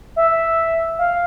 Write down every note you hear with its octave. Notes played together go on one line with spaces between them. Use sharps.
E5
F5